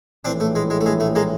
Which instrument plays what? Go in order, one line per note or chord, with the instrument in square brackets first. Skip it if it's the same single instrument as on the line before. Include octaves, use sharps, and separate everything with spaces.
[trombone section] A#1 A2 E3 [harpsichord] C4 D4
[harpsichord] A3
G#3
G#3
A3
G#3
A3
G#3 A#3